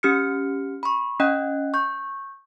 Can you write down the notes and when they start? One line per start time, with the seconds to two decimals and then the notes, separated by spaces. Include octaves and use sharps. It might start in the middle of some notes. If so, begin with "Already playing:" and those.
0.03 C#4 G4 F6 C#7
0.83 B5 C#6
1.20 C#4 D#5 G5 F#6
1.74 C#6 G6